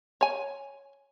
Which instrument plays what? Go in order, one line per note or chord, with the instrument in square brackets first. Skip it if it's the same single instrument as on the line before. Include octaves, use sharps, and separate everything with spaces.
[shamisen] C#5 G#5